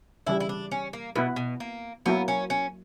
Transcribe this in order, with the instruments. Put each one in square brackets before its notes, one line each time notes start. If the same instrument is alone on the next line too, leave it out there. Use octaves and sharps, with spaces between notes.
[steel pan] C#3 E3 G3 [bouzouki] E4
[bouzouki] E4
D4
C#4
A#3
[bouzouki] B2 [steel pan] B3 E4 B4
[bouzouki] B2
A#3
[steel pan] F#3 A#3 E4 A#4 [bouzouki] B3
[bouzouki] C#4
C#4